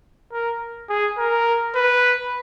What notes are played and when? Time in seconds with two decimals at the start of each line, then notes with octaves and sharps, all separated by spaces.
0.32 A#4
0.89 G#4
1.18 A#4
1.75 B4